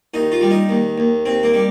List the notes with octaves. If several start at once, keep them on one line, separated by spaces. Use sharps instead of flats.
D#2 D#4
F4
G3
D#4
D#2
D#2
D#2 C4
A#3
G3